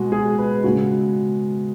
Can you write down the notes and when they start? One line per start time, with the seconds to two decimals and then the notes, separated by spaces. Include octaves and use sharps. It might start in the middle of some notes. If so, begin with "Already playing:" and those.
Already playing: B2 G#3 F#4
0.12 G#4
0.38 B4
0.64 C#3 G#3 F#4